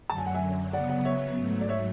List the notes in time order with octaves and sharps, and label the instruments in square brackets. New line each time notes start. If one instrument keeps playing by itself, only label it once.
[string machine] F#2 D3 F#3 [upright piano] A5
[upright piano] G#5
F#5
E5 G#5
[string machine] C#3 F#3 B3 [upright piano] D5 F#5
[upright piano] D5 F#5
C#5 E5
[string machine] G#2 F#3 A3
[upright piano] D5
C#5 E5